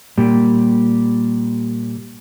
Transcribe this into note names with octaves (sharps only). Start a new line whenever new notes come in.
A#2 G3